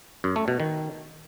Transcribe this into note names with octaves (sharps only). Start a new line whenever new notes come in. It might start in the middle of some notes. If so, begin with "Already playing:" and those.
F#2
A3
B2
D#3